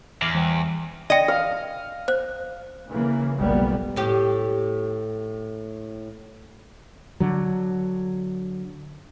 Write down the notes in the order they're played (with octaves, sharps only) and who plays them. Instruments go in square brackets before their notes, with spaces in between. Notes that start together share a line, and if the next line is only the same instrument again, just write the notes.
[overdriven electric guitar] E2 [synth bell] D6 F6 C7
[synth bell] E3 G5
[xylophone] D5 G5 [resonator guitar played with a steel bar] D#5
[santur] F5
[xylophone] C5 F#6
[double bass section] C#3 E3 A#3
F1 B1 G3 A#3 B3
[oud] A2 G4
[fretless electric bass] D3 F#3